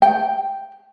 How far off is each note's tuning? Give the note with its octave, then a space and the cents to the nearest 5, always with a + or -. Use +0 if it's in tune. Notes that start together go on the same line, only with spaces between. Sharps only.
G5 +0